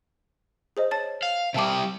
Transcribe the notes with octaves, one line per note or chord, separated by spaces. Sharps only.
G#4 C5 D#5
C#5 A5 A6
F5
C3 G3 E5 A5 D6